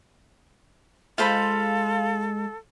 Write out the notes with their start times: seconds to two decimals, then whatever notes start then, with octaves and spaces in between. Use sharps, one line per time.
1.18 G#3 F4 A4 C5 F5 B5